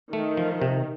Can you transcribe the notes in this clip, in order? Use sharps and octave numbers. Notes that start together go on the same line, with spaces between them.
D#3 A3
F3
C3